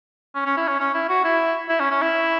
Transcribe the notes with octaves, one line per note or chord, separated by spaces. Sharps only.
C#4
C#4
E4
C#4
C#4
E4
F#4
E4
E4
C#4
C#4
E4